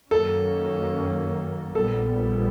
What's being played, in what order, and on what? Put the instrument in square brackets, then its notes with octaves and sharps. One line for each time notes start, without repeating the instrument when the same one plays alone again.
[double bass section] F#2 D#3 F#3 A#3 C#4 [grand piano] A4
[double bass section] A#1 A#2 G3 B3 [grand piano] A4